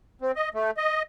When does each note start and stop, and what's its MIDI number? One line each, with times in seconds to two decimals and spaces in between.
0.21 0.32 60
0.36 0.49 75
0.54 0.71 57
0.77 1.02 75